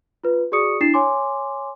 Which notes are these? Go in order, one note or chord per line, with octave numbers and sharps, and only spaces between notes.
F4 B4
F#4 G#4 D5 C#6 D#6 C#7
D4 E4 A6 C7 E7
C#5 G#5 C6 D6